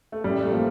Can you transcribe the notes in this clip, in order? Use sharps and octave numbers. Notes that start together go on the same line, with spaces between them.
A3
A1 G3
A3
F3 A#3